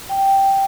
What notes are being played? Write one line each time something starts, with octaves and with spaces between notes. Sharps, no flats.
G5